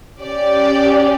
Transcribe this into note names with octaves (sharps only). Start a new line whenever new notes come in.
C#4 G4 D5